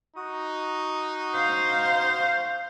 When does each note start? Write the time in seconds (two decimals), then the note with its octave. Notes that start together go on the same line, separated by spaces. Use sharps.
0.16 D#4 F#4 D#6
1.34 C5 F5